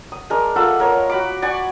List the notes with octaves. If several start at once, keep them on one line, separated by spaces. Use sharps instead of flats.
D#6
G#3 D4 A#4
F4 A4 E5 F#5
A#4 C#5 D#5
F#4 B5 D6
D5 F#5 G#5 C#6